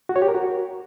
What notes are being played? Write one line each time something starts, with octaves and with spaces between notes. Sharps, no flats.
F#4
C#5
G4
A#4
F#4